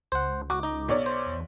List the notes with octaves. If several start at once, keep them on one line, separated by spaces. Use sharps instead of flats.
C#2 C5 F#5
F#4 D6
D#4 D#5
B1 C#5 D5
C5
E2